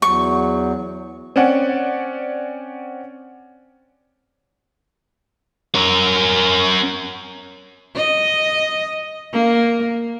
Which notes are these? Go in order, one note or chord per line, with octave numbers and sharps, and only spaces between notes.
E2 F#3 C#6
C4 C#4 D5 F#5
C#4 A#4
D#5
A#3